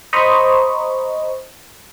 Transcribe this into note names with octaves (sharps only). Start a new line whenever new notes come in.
C5 D#5 A#5 B5 C#6